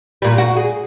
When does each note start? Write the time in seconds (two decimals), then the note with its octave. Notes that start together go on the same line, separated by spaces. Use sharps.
0.22 A#2 G3
0.38 F#4
0.56 G#4